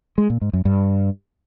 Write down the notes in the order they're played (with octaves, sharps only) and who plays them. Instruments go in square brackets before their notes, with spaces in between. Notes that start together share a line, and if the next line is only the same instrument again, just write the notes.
[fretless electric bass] G#3
A#2
G#2
F#2
G2